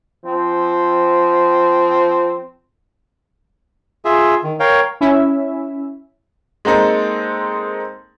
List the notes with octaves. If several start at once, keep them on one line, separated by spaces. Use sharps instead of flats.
F3 C4
F4 G#4 E5
D#3
A#4 C#5 F5 G5
C#4 E4 E5
G#3 A#3 C4 D#4 A4